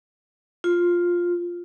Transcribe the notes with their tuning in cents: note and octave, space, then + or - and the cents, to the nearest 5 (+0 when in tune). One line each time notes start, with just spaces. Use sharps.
F4 +5